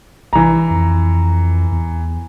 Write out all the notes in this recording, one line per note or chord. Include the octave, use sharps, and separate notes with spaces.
A#1 E3 A#5
F2
E2